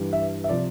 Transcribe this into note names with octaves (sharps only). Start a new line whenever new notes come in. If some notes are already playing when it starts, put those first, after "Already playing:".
Already playing: G2 E3 G3
E5
E5
C3 F3 D5